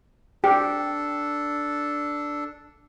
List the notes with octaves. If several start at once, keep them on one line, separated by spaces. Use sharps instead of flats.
D4 G4 A4 G5